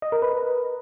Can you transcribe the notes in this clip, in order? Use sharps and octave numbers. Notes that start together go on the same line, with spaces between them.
D#5
A#4
B4